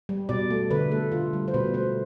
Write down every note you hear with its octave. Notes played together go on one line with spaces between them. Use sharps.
G3
B2 D5
A3
D3 B4
A3 A4
D3 F4
G3
C5
B2 B4
A3 C5